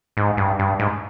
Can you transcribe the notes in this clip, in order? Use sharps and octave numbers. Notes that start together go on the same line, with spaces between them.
G#2
G2
G2
G#2